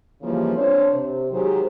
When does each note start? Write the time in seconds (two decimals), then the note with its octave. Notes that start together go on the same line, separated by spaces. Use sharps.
0.22 C#3 E3 F3 G3 A#3
0.56 C4 D4 C5 C#5
0.93 C3
1.31 D#3 F#3 G#3 G4 G#4 C5